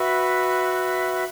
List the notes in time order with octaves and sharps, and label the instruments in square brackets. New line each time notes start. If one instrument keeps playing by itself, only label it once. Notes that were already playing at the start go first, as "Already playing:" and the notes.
Already playing: [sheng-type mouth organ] F#4 B4 E5